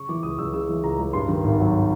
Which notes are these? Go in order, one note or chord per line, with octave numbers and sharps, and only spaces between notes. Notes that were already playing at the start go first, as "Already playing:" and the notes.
Already playing: C#3 C#6
E3 D6
C#2 D#6
C#2 E6
C#3 E6
E3
C#2 A#5
C#2 A#5
G2 C6
D#3
G#1
F#3